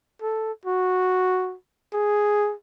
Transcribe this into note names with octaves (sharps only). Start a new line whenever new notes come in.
A4
F#4
G#4